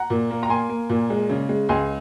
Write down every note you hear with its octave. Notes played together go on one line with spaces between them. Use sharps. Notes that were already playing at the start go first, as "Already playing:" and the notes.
Already playing: F#5 A#5
A#2
A#3
A#5
A#3 G#5 C6
A#3
A#2
G#3
C#3
G#3
C#2 G#5 C6